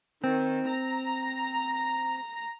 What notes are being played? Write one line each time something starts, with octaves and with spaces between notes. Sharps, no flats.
D#3 C4
A#5